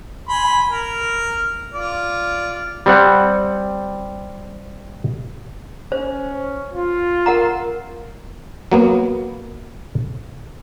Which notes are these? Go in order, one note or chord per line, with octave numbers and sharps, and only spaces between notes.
G#5 B5 C6
A#4
F4 D5
G3 C4 F#5
C#4 C5
F4
A#4 F#5 A#5
F#3 A#3 B3